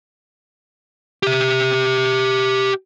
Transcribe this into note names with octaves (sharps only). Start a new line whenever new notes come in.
G4 E5